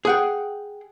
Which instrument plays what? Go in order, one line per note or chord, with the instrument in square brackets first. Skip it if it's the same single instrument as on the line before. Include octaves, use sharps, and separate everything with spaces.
[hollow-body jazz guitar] G#4 F#5 G5